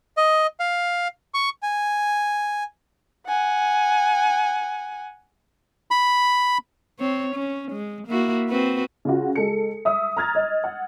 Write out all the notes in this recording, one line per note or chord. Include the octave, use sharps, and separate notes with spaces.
D#5
F5
C#6
G#5
F#5 G#5
B5
C4 C#5
C#4
G#3
A#3 E4 F#4
C4 F#4 B4
C#3 F4 F#4
G#3 A4 C#7
E5 D#6 E6
A#5 F6 G#6 A6
D#5
F#5